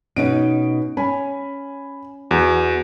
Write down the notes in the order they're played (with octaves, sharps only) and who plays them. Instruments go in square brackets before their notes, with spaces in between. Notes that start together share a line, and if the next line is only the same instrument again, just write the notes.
[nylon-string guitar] B2 C#4 D#4 [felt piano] D7
[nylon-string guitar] C#4 [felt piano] G#5 B5
[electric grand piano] E2 [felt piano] F#4